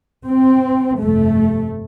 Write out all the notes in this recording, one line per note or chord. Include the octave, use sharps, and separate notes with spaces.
C4
G1 F2 C3 A3